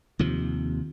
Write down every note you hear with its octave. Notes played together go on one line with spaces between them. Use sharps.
D#2 C3 F3